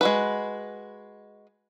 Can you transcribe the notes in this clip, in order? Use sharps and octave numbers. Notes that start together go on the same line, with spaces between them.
G#3 F#4 B4